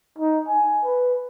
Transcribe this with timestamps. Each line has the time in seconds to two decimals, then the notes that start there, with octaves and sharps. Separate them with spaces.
0.18 D#4
0.48 G#5
0.84 B4